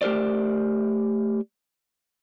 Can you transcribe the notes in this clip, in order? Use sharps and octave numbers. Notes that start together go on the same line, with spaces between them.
A3 G4 A#4 C5 D5